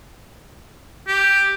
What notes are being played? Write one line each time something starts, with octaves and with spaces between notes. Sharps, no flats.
G4